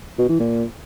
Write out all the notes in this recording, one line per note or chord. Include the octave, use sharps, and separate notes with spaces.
B2
E3
A#2